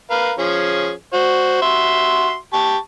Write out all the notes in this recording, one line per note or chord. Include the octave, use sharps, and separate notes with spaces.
A#4 B4 F5
F3 C#4 G#4
F#4 C5
F#4 E5 C6
G4 A5 C#6